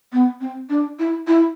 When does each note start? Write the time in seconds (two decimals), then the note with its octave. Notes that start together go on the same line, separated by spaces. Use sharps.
0.13 B3
0.41 C4
0.70 D4
0.99 E4
1.28 E4